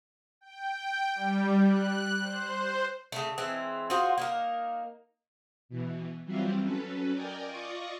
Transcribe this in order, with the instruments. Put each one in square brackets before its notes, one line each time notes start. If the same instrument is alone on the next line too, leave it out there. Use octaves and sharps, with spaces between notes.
[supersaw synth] G5
G3
F#6
C5
[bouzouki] C#3 A3
E3 G#3 C4
F4 F#4 G#4 C5
A#3 D#4 A#4
[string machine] B2 E3
E3 F#3 G3 C4 E4 F4
F#3 C#4 A4 B4
A#4 D5 D#5 G5 G#5
F4 D5 D#5 C#6 D#6